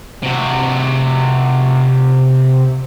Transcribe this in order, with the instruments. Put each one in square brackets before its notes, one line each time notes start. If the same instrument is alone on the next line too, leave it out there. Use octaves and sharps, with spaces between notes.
[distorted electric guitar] C3 F#4